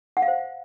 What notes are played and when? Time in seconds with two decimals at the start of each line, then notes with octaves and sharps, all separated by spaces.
0.17 F#5
0.22 F5
0.28 C5